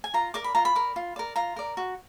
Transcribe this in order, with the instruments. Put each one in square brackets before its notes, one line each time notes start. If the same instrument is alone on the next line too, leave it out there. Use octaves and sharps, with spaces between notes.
[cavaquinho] G#5
F4 A#5
A#4 D5 D6
B5
F4 A#5
B5
A#4 D5
F4
A#4 D5
F4 A#5
A#4 D5
F#4